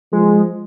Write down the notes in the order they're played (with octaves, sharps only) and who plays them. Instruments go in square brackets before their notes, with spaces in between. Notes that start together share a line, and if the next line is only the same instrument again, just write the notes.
[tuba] F3 [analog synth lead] G#3